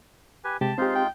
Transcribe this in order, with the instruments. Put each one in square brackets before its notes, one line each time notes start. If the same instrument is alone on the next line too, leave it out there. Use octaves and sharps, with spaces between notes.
[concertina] G4 B4 G#5
[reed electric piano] C3 G#3 [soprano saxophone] G4 [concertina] A5
[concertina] G#3 D#4 F4 [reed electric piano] C4 G4 [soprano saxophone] C5
[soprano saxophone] G5